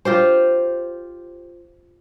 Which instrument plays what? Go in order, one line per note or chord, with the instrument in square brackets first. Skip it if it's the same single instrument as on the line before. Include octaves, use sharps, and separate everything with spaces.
[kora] F4 G4 C5